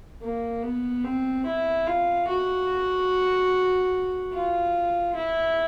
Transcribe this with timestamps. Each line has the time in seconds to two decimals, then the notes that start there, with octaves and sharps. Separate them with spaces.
0.22 A#3
0.63 B3
1.04 C4
1.46 E4
1.87 F4
2.28 F#4
4.33 F4
5.15 E4